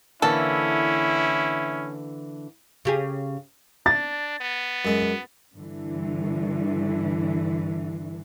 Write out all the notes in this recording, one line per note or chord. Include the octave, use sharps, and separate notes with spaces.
D3 E3 A#3 C#4 E4 A4
C#3 G4 G#4
D4 A6
B3
F#2 G#3
G2 D3 E3